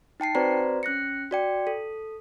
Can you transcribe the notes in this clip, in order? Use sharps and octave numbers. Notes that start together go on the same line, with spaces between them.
D#4 G5 A5 C7
C4 F#4 B4 C5 D5 A#5
C#4 F#6 A#6 C#7
F#4 D5 G5
A4